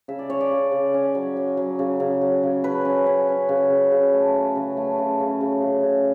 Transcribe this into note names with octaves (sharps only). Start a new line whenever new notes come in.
C#3 E5
D5
C#4 C#5
D5
C#3
C#3
C#4
F#3
F#3
F#3
C#3
C#3
F#3
C#3
C#4 B4
C#4
C#4
C#4
C#3
C#3
C#3
A3
F#3
C#3
A3
C#3
C#3
C#3
C#3
C#3